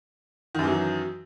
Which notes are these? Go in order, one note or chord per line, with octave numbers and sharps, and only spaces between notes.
F#2 D#3 E3 F#3